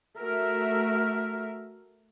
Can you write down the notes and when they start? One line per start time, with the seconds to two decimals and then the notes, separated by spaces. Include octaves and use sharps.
0.18 A3 F#4 A#4 E5